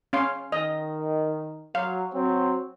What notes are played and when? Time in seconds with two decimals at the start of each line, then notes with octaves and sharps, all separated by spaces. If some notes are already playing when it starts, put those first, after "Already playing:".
0.13 C#4 F5 C6
0.52 D#3 D#5
1.75 F#3 F5
2.13 F#3 C4